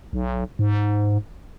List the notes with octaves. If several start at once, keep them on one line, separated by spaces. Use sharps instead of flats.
B1
G#2